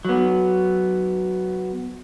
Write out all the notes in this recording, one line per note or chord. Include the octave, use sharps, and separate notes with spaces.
F#3 B3